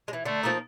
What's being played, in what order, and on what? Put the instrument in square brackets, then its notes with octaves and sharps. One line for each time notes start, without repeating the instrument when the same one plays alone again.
[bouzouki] G#3
E3
[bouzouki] D3 [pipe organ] A3
[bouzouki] F3 A#3 D#4